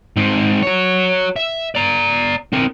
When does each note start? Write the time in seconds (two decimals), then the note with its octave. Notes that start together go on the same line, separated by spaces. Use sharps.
0.17 G#2 C4
0.62 F#4 C#5
1.36 E5
1.75 D5 A#5
2.53 C4 A#4